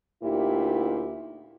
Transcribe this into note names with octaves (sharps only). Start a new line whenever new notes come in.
D2 A#2 D#4 E4 G4